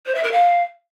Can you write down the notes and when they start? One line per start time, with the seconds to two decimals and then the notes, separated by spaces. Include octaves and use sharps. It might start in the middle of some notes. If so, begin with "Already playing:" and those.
0.06 C5
0.15 E5
0.23 A#4
0.32 F5